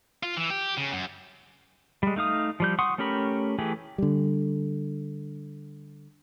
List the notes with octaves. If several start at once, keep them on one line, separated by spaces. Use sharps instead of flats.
F4
E3
G4
C#3
F#2
G3 G#3
A3 D#4 F5 D#6
F3 G3 G6
F#5 C6 C#6 D#6
A3 C#4 G4 A#4 B5
E3 A3 G4 G#4
D3 G3